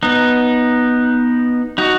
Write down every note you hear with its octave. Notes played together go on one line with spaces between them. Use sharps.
B3 D#4
D#4 F#4